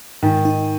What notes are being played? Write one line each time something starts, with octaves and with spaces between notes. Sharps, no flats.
G#2 D#3
D#4